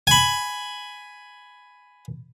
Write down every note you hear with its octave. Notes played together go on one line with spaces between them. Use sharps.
G#5 B5